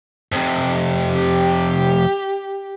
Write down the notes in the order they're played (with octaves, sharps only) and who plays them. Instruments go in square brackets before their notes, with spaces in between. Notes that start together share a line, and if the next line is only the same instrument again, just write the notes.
[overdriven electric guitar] F2 C3
[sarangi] G4